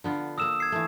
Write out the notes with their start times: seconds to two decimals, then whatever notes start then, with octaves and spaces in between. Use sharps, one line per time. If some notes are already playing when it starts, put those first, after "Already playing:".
0.04 D3 B3 F4
0.38 A#3 A#4 D#6 E6 E7
0.60 G#6 C7
0.72 E3 A3